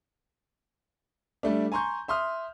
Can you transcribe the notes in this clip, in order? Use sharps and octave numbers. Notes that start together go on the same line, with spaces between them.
G3 A3 D4
G#5 A#5 C6 C#6 G6
E5 C6 D#6 F6